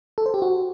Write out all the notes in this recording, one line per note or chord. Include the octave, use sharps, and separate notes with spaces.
A4
C5
G4
F#4